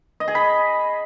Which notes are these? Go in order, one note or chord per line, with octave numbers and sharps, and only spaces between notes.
D#5
G#4
B5